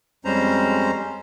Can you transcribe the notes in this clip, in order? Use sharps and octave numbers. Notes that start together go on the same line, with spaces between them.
F2 G3 G#3 C#4 C5 A#5